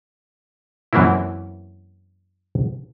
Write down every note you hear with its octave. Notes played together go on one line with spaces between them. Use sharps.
F#2 E3 F#3 A#3 C4 E4